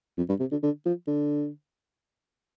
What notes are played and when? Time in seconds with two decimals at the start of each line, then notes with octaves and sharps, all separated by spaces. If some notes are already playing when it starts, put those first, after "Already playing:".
0.17 F2
0.29 G2
0.40 C3
0.51 D3
0.63 D3
0.86 F3
1.07 D3